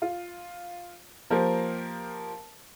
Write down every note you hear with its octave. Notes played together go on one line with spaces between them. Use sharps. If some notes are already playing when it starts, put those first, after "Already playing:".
F4
F3 A#3 G4 A#4 C5